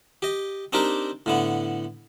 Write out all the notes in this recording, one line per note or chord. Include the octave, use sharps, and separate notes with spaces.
G4 D#5
C4 D4 D#4 G4 A#4
A2 D3 B3